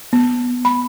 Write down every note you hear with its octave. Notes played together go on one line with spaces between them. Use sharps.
B3
B5